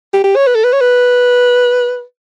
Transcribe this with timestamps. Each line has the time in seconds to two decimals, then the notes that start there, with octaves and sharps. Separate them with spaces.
0.14 G4
0.24 G4
0.36 C#5
0.47 B4
0.55 A4
0.64 B4
0.73 C#5
0.81 B4